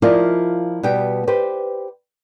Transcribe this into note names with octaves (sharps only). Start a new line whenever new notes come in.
F3 E4 F4 A#4 D5 D#5
B2 G3 B3 G5
G4 B4 C5